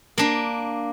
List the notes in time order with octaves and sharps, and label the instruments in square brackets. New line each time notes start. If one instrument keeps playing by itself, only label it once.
[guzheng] A#3 D4